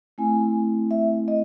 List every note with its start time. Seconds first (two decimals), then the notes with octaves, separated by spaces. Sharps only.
0.18 A3 C4 E4 G#5
0.91 E5
1.28 D#5